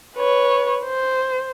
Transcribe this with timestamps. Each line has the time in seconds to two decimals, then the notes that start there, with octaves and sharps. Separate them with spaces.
0.17 B4 C#5
0.84 C5